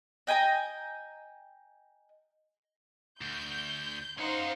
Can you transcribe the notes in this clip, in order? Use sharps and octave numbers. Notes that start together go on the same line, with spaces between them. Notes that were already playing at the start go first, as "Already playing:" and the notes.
D#5 G5 G#5 A#5
D2 G6
C#4 D#4 C5 F5 F#5